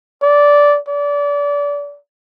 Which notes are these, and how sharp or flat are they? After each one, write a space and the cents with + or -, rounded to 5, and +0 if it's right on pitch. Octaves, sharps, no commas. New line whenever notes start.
D5 -15
D5 -30